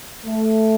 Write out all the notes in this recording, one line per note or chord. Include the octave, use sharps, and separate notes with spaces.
A3